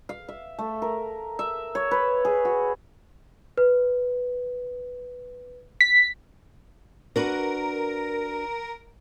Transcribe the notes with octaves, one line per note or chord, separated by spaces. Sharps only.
F5
E5
A3
A#4
E5
C#5
B4
G#4
F#4
B4
B6
D4 F#4 A#4 B4